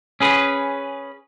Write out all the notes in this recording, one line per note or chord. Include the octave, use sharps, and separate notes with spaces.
C#4 G#4 B4